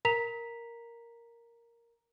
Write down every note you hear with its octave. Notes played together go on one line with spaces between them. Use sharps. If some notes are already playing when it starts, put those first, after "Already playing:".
A#4 A#5 B6 F7